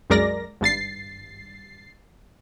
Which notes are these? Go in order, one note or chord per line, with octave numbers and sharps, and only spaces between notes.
C2 F#2 G#3 A#4 D5 A#6
G#1 G2 A6 C7